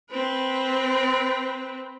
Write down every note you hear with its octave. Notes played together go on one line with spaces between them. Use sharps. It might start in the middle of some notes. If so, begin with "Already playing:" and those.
C4 B4